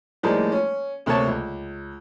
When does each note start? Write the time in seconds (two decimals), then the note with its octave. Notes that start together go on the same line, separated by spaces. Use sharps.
0.23 A2 F3 G3 G#3 A#3 D#4
0.52 C#4
1.06 D2 C3 A3 A#3 C#5 A5
1.28 C#2